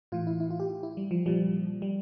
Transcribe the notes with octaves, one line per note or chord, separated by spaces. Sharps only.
A2 E3 F4
E4
E4
F4
G4
E4
G3
F3
A#2 F3 G3
G3